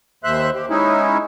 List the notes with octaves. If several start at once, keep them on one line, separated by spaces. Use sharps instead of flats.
D#2 C5 E5 F#6
G4
G#3 C#4 D#4 E4